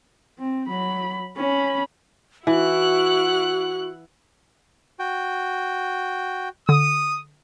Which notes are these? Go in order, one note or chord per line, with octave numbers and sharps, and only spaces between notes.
C4
F#3 B5
C#4 B5
E3 E4 F#4 F#5 F#6
F#4 G5
D3 D#6